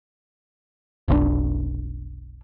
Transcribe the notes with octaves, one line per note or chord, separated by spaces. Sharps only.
F1 B1 A2 D4